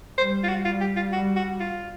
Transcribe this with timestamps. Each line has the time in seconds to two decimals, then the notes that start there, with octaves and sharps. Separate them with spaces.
0.18 G3 C5
0.44 F4
0.49 F#4
0.65 G3 F4
0.80 G4
0.96 F4
1.12 G3 F#4
1.36 F#4
1.60 F4